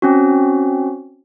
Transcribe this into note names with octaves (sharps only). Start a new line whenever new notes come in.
C4 C#4 F#4